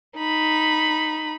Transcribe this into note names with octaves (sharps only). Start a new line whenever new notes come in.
D#4 B5